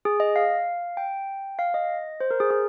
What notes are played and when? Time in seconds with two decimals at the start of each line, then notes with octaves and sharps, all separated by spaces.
0.05 G#4
0.20 D#5
0.36 F5
0.97 G5
1.59 F5
1.74 D#5
2.20 C5
2.31 A#4
2.40 G#4
2.50 G#4